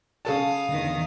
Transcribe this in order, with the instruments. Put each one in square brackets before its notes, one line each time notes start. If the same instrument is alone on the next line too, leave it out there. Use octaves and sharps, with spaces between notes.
[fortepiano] C#3 A4 A5 [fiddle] F5 D#6
[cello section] E2 D#3 [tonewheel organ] D3